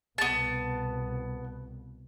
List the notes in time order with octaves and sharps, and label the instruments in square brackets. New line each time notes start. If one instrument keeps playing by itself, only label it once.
[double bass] C2 B2 [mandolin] B3 A5